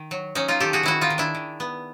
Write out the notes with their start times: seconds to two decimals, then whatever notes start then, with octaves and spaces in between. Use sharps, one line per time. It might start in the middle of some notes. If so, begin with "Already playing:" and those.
Already playing: D#3
0.11 F#3
0.35 F#3 C#4 D#4
0.48 D#4 F4
0.60 D#3 G4 A4
0.73 F#4 G#4
0.83 D#3 E4 F#4
1.01 D#4 F4
1.10 D#3
1.18 D4 E4
1.35 D#3
1.60 B3